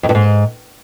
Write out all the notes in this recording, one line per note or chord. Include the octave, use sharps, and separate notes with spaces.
F2
G2
G#2